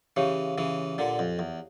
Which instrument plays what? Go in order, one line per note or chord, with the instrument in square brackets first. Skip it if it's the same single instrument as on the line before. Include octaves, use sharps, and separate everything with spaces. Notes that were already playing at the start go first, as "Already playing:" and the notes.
[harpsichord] C#3 E3 [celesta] G4 C#5 F5
[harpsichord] C#3 E3
A#2 D3
F2
E2